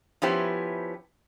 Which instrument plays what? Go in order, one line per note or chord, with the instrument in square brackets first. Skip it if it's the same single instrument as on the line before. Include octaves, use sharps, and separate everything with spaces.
[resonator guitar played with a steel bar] F3 B3 C#4 E4 G4 C5